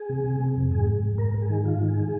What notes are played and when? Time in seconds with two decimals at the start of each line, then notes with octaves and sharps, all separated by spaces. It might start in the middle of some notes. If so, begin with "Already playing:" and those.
Already playing: G#4
0.09 C3
0.24 C3
0.40 C3
0.57 F2
0.71 G#2 G#4
0.87 G#2
1.02 G#2
1.18 G#2 A#4
1.34 G#2
1.42 G#4
1.50 D#3
1.65 G#2 F4
1.81 D#3
1.88 G#4
1.97 D#3